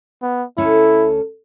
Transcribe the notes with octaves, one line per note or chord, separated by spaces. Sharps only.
B3
D2 C#4 E4 A4